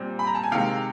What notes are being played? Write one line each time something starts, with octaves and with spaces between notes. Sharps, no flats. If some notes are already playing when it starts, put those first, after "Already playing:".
Already playing: A#2 G3 C4
B5
A#5
A5
G#5
C3 D#3 G#3 F5 G5